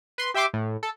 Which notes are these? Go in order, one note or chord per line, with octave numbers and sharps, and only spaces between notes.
B4 C6
G4 E5 G5 C6 D6
A2
A4